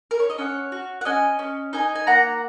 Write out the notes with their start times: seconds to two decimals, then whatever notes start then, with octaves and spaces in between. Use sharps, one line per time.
0.11 A#4
0.20 C#5
0.30 D#5
0.38 C#4 C#5 F#5
0.72 F#4
1.01 F#5
1.05 C#4 D#5 G#5
1.39 C#4
1.73 D#4 D#5 G#5
1.95 G#5
2.07 A#3 F#5 A#5